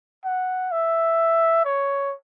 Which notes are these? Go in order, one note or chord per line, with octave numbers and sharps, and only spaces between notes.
F#5
E5
C#5